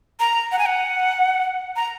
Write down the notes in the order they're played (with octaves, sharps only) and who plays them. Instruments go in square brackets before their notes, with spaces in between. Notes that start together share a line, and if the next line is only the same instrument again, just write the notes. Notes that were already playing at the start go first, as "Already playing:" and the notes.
[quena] A#5
F#5
G#5
F#5
A#5